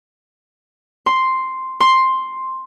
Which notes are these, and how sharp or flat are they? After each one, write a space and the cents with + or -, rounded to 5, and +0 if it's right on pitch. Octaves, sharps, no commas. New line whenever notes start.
C6 +0
C6 +5